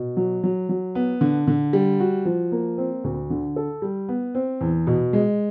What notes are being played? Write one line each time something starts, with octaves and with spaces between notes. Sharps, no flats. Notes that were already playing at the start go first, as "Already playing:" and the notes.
Already playing: B2
F#3
F#3
F#3
B3
D3
D3
G3
F#4
F3
A#3
C4
D2
D3
A4
G3
B3
C4
E2
B2
G#3